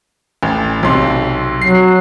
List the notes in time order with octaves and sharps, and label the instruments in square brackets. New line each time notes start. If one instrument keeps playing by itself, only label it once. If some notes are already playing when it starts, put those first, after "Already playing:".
[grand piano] A1
B1 C3 C6
[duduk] F#3 [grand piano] C7